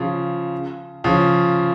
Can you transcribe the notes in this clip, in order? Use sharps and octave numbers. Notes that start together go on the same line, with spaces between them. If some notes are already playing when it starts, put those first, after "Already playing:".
Already playing: C#3 F3
C#3 F3